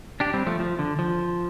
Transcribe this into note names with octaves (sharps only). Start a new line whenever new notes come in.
D4 G4
G3 C4
F3 A3
F3
D3
F3